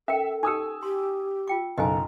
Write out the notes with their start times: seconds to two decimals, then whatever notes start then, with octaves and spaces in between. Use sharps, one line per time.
0.08 C#4 A4 A#4 E5 G5
0.43 D#4 G4 G#5 D#6 E6
0.83 G4 C6
1.48 F4 G5 D6
1.78 F#1 B1 A4 D#5 G#5 A#5